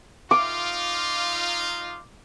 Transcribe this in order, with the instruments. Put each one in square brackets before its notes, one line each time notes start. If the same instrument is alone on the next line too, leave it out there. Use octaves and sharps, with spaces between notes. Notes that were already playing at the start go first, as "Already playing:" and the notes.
[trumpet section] D#4 F4 [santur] D6